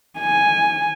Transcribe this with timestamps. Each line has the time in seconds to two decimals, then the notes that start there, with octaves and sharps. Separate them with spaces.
0.19 G#5